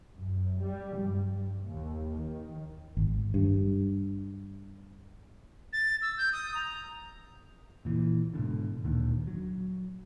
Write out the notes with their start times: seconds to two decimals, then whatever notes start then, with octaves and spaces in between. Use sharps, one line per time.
0.11 F#2
0.60 G3
0.95 G2
1.66 D#2
2.11 D#3
2.97 G#1
3.34 G2
5.73 A6
6.02 E6
6.18 G6
6.33 D#6
6.55 A#5
7.85 A#2 E3
8.34 G#2 B2 D3
8.84 D2 A#2 D3 D#3
9.27 F#3